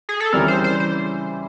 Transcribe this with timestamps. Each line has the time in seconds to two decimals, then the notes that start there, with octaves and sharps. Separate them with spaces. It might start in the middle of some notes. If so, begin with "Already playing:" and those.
0.09 G#4
0.20 A4
0.32 C#3 E3 G3 C4 A#4
0.48 C5
0.64 C5
0.80 C5